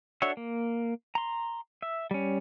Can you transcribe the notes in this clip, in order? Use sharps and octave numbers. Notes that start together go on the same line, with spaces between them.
D4 F#4 A4 C#5 E5
A#3
A#5 C6
E5
G3 C#4